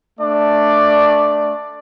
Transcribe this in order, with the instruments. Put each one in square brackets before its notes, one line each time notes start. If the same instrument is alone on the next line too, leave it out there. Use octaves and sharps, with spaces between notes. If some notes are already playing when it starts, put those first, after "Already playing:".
[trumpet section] A3 D4 D5